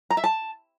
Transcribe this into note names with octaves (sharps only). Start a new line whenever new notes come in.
A#5
E5
A5